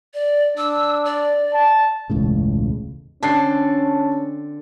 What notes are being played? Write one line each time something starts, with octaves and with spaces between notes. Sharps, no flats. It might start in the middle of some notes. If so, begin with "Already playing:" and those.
D5
D4 E6
D5
A5
E1 C#2 A2 C#3
D3 C4 C#4 A5 A6 C7